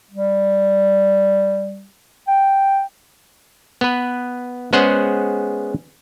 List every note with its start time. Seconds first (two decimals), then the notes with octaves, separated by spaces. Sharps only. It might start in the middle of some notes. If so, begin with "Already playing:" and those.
0.11 G3
2.28 G5
3.81 B3 B4
4.73 G#3 B3 C#4 G#4 C5 F#5